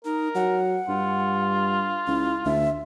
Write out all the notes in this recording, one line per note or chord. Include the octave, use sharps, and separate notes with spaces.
D#4 A#4
F#3 F#5
G2 F4
C#2 E4
D2 E5